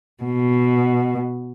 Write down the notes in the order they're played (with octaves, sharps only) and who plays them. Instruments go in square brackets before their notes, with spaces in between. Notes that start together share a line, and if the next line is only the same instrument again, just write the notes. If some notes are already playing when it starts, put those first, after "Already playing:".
[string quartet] B2